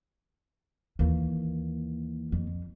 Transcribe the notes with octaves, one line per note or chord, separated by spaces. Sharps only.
D#2 D#3 E3 A#3
F2